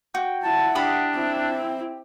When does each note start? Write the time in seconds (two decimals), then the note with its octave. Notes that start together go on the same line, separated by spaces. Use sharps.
0.15 F#4 G5
0.44 E4 F#5 A5
0.75 D4 G4 B5 D#6
1.14 C4 E4